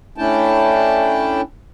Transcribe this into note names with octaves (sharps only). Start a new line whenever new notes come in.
A3 C#4 D4 E4 G5 A5